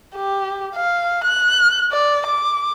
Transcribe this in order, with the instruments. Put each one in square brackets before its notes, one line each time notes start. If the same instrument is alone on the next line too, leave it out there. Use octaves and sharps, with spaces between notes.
[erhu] G4
F5
F#6
D5
D6